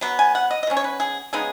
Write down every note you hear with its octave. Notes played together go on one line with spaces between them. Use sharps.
F#3 B3
G#5
F#5
D#5
D#5
B2 F#3 C#4
C#5
B4
G#4
C#3 G#3 B3 D#4 G#4